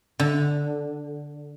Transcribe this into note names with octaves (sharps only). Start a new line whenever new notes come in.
D3